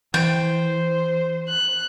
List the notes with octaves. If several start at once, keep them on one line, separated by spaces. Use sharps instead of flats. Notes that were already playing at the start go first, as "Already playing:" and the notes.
E3 C5 G5
F#6